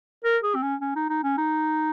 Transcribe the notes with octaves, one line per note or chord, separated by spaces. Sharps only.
A#4
G#4
C4
C#4
C#4
D#4
D#4
C#4
D#4